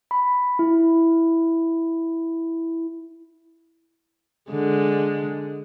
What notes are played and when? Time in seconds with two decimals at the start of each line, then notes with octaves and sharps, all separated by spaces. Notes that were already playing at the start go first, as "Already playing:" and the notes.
0.11 B5
0.59 E4
4.50 D3 G#3